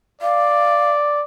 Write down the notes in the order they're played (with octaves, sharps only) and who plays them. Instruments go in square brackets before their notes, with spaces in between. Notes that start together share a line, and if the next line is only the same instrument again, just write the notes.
[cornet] D5 [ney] F5